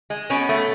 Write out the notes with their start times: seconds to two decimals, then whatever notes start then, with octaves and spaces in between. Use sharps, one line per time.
0.10 G#3
0.30 B2 C#4
0.49 A3